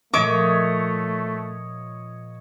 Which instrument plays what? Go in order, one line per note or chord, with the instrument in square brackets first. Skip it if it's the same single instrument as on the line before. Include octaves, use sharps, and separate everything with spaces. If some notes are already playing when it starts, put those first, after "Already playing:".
[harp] A#2 F3 G#3 [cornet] A3 [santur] C#5 D#5 [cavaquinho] E5 D6